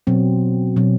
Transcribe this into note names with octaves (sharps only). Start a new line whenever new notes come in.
B2 F#3 C4
B2 F#3 C4